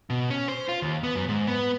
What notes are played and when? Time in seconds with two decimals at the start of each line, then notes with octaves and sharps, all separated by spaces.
0.10 B2
0.30 C#4
0.48 C5
0.69 F4
0.82 D#2
1.03 B3
1.15 F#2
1.28 G#2
1.47 B3